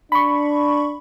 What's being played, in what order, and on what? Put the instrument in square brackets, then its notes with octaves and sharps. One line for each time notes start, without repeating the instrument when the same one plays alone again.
[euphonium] D4 [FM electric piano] B5 C#6